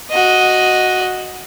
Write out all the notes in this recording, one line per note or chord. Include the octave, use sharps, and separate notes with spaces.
F#4 D#5